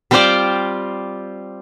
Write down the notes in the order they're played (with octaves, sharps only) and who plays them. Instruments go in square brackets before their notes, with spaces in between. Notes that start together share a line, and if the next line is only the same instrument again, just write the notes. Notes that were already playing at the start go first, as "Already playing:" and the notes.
[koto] G3 C4 F4 C5 D5 F5